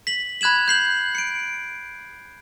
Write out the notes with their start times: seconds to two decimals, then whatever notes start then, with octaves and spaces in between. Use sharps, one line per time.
0.07 B6 F#7
0.41 B5 F#6 G#6 E7 F#7
0.68 G6 C7 F#7
1.15 C#7 D7